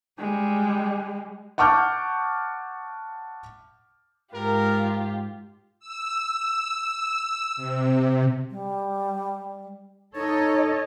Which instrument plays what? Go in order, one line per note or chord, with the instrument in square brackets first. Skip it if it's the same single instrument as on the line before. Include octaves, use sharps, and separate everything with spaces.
[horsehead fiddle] G3 G#3
[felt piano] F#5 A5 C#6 D6 F6 G6
[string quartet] G#2 F4 G4 [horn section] A#4
[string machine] E6
C3
[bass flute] G3
[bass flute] D#4 [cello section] A4 C#5 D#5